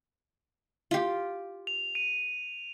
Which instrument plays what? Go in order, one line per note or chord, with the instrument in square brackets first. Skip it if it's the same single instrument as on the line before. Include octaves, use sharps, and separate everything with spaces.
[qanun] F4 G4
[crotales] F7
D#7